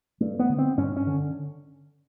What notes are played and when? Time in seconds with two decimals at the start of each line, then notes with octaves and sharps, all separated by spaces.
0.20 G2 A3
0.39 B3
0.49 D3
0.58 C4
0.77 G2 C#4
0.97 C#4
1.06 D3